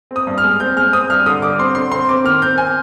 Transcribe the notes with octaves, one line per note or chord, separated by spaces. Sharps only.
C4
D#6
G2
F6
G#3
C4 G6
G#3 F6
C4 D#6
G2 F6
D3 D#6
G2 D6
C4 C6
D3 C6
C4 C6
C4 D6
D#3 F6
C4 G6
C4 G#5